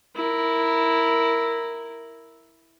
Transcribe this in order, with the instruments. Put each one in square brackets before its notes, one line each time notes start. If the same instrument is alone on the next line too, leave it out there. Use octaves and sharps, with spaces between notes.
[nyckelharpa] E4 A#4